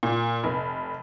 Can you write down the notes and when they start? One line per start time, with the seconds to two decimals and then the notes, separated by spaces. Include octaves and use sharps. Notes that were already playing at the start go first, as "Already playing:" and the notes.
0.03 A#2
0.44 F1